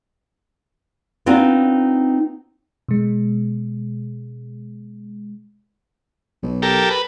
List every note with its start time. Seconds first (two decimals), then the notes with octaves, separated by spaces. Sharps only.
1.26 B3 C4 D4 D#4 F4
2.89 B2 G#3
6.43 B1
6.62 G4 A4 A#4
6.90 B4